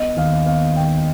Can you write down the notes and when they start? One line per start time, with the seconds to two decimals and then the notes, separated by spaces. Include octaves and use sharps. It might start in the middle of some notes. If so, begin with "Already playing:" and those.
Already playing: B3 D#5
0.16 D#2 F5
0.46 B3 F5
0.76 D#3 G5